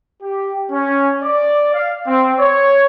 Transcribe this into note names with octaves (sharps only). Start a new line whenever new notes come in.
G4
C#4
D5
F5
C4
C#5